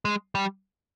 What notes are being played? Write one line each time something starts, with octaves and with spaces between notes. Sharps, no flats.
G#3
G3